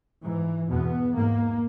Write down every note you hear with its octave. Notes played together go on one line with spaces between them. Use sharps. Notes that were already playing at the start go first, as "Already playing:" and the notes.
G#2 E3
E2 B2 B3
G#2 A#3